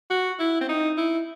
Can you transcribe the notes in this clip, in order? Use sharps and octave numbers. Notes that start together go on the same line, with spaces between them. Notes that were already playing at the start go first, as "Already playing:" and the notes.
F#4
E4
C4
D#4
E4